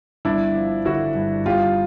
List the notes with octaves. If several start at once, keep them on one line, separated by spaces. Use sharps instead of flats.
G1 D4 E4
F3
D3 E4 F#4
G2
G1 F4 G4